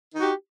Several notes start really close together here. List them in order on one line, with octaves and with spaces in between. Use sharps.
D#4 F#4 G4